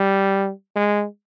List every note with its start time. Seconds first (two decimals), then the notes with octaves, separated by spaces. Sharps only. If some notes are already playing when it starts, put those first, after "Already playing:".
Already playing: G3
0.76 G#3